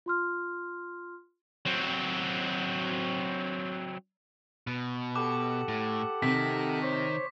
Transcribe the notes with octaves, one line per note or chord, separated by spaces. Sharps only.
F4 C6 F6
F#3 C4
B2
G4 A4 F#5 D6
A2
C3 D#3 B6
C5 C#5